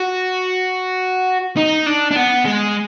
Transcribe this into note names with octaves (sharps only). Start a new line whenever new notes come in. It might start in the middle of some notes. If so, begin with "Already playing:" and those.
Already playing: F#4
D#4
D4
D4
B3
G#3